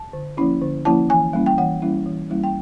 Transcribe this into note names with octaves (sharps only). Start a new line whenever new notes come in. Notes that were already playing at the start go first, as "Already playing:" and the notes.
Already playing: A5
D3
F3 A#3 C#4 E4
D3
F3 A#3 C#4 E4 A5
E3 G#5
G3 A#3 C#4 E4
G5
E3 F#5
G3 A#3 C#4 E4
E3
G3 A#3 C#4 E4
G5